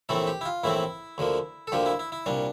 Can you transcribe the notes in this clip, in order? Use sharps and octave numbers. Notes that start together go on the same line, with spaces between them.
A#1 A2 E3 A3 C4 A4
G4
E4
F4
A#1 A2 E3 A3 C4 E4
D2 D3 F3 A#3
A4
D2 D3 F3 A#3 G4
E4
E4
E4
C2 A#2 G3 D4